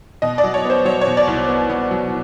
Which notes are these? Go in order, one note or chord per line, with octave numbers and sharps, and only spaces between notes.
B2 D#5
D5
F#3
C#5
B3
C5
F#3 C#5
C#5
B2
D5
C2
B3
B3
F#3